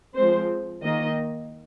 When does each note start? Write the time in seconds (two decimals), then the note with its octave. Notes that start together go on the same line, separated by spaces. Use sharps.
0.14 F3 G#3 C4 C5
0.83 D#3 A#3 D#5